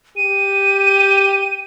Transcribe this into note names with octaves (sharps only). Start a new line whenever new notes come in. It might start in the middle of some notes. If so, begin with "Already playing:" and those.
G4 D#7